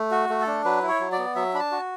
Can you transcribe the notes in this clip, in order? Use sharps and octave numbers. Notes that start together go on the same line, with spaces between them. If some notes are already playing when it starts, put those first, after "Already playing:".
Already playing: A3
F#4
A3
A4
D4
F#3 B4
E4
C#5
F#3
D5
B3
F#3 E5
D4 B5
A5
F#4